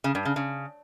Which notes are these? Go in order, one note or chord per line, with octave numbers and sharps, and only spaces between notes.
C#3
G2
C#3
C#3